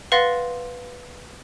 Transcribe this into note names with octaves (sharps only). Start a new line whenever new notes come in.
B4 F5 F#5 C6 A6 A#6